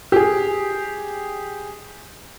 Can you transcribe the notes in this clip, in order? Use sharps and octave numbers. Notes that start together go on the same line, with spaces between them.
G4 G#4